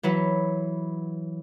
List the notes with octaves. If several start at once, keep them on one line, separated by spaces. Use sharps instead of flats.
E3 F#3 F#4 B4